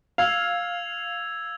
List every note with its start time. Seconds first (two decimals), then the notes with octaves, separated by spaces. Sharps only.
0.18 F5 E6 G#6 F7